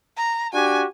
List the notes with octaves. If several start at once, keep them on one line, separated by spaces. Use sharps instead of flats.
A#5
D4 F#4 G4 G#5